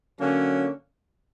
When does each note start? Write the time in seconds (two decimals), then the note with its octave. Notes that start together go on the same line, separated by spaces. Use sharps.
0.20 D3 F#3 A#3 C#4